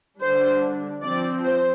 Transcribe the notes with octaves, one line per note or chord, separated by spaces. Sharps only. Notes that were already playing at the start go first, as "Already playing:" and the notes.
D3 G3 D4 C5
F3 C4 D5
C5